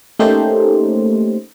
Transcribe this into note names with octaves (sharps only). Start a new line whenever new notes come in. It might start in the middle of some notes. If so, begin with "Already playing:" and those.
A3 A#3 C#4 D#4 G4 C5